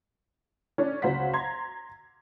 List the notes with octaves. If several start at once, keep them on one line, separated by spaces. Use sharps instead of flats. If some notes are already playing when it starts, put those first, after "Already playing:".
C#4 D4
C#2 F#3 C5 F5 F#5 B6
A#5 C6 G#6